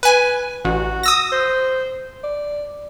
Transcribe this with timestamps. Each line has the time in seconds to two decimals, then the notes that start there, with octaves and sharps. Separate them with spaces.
0.03 B4 G#5
0.64 A1 F#4
1.03 D#6 E6 A#6
1.32 C5
2.23 D5